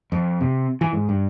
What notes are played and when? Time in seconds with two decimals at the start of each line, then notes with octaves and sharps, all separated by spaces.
0.12 F2
0.41 C3
0.81 E3
0.93 G#2
1.09 G2